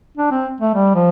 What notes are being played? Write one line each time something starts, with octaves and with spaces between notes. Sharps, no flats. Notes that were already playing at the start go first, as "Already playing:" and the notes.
D4
C4
A3
G3
F3